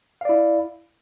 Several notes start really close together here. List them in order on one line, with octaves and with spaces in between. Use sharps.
F5 D5 E4